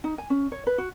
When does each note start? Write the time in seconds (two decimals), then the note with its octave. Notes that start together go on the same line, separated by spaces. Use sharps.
0.04 D#4
0.18 G#5
0.30 C#4
0.52 C#5
0.67 B4
0.78 F#4